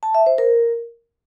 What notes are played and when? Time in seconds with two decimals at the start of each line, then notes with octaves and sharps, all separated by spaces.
0.03 A5
0.15 E5
0.26 C5
0.38 A#4